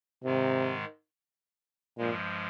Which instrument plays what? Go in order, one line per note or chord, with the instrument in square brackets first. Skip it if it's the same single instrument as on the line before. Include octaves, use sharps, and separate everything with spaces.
[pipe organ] G#2 D#3 G#3 [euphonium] C3
[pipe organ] G2 F3 G#3 [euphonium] A#2